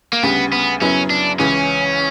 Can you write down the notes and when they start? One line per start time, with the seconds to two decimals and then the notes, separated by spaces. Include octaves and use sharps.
0.13 A#3
0.23 D2 C#3 G3 B3
0.53 B3
0.81 F#2 C#3 F#3 B3 C#4 E4
1.10 D4
1.39 C#2 C#3 E3 C#4